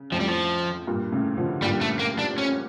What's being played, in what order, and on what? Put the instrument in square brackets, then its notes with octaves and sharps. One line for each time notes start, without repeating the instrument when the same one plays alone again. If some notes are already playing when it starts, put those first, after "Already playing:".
Already playing: [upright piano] C#3
[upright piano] F2 A2 [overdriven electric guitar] F3
[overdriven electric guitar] G3
F3
[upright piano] G2 A#2
A2 C#3
D3 F3
[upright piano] G2 A#2 [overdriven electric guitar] G3
[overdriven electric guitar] A3
A#3
D4
C#4